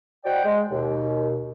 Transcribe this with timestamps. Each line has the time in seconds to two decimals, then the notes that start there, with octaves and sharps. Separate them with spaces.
0.24 F#4 C5 D5 D#5 F#5 G5
0.44 G#3
0.71 D#2 B2